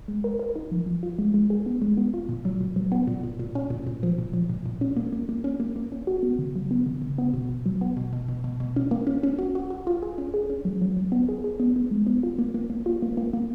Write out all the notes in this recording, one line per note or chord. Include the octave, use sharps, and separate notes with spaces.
G#3
A#4
A#4
D#4
F3
F3
F4
G#3
G#3
G#4
B3
G#3
B3
F4
A#2
F#3
A#2
F#3
B3
A#2
A#2
A#2
C#4
A#2
A#2
F3
A#2
F3
A#2
A#2
C#4
A#3
A#3
A#3
C#4
A#3
A#3
C#4
F#4
B3
C#3
F#3
B3
C#3
C#3
B3
B2
B2
F#3
B3
B2
B2
B2
B2
B2
C#4
A#3
C#4
C#4
F#4
F#4
F#4
F4
G#4
C#4
G#4
C#4
F#3
F#3
F#3
B3
G#4
G#4
B3
B3
G#3
B3
F4
A#3
A#3
A#3
F4
A#3
A#3
A#3